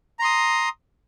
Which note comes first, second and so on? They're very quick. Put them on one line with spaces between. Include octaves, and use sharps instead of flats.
A#5 C6 D#6